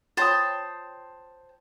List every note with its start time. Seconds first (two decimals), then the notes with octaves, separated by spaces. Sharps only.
0.17 F4 C5 C#5 G5 A5 D#6